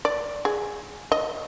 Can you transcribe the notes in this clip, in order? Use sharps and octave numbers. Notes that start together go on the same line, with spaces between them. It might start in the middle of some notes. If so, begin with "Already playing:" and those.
D5
G#4
D#5